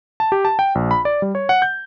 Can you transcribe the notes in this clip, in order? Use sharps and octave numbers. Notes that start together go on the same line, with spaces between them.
A5
G4
A5
G5
A#1
B5
D5
G3
C#5
F#5
G6